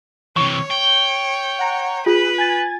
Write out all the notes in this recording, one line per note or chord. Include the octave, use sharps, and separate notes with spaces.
C3 E3 C#5 C#6
G5
F#5 A#5
F4 G#4 B4
G#5 G#6 A6